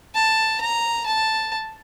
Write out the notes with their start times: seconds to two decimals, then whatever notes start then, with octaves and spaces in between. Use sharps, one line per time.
0.15 A5
0.60 A#5
1.06 A5